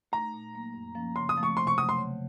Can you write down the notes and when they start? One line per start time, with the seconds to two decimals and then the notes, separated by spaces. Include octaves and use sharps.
0.12 A3 D#4 A#5
0.33 A#2
0.54 F#3 A#3
0.74 F#2
0.95 F3 A#3 C#4
1.16 C#3 C6
1.29 D#6
1.37 F3 A3 C4
1.43 C#6
1.57 C3 C6
1.67 C#6
1.78 F#3 A3 D#6
1.89 C6
1.98 C#3